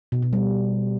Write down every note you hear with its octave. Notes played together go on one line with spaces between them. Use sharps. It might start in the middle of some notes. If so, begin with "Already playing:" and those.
B2
B2
G3